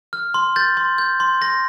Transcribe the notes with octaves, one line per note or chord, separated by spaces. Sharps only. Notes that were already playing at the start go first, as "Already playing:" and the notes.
F6
C6
G6 A6
C6
G6
C6
C6 A#6